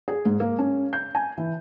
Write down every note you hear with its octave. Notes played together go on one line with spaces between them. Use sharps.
G#4
G#2
A#3
C#4
G6
G#5
E3